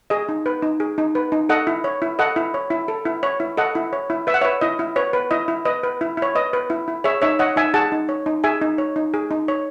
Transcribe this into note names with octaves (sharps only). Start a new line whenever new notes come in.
G#4 D#5
D#4
B4
D#4
G#4
D#4
B4
D#4
A4 D#5 F#5
E4
C#5
E4
A4 D#5 F#5
E4
C#5
E4
A4
E4
C#5
E4
A4 D#5 F#5
E4
C#5
E4
B4 E5
F#5
C#5 E5
B4
E4 D#5
E4
B4 C#5
B4
E4 D#5
E4
B4 D#5
B4
E4
E4 C#5
B4 D#5
B4
E4
E4
G#4 C#5 E5
D#4 C#5 E5
C#5 D#5 F#5
D#4 E5 G#5
G#4 F#5 A5
D#4
C#5
D#4
G#4 E5 G#5
D#4
C#5
D#4
G#4
D#4
C#5